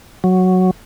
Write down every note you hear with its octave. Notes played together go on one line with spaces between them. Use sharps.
F#3